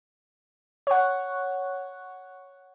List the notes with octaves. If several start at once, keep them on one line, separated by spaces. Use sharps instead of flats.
C#5 F#5